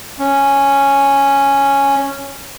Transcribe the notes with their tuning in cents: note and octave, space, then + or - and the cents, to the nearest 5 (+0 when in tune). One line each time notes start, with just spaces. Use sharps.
C#4 -5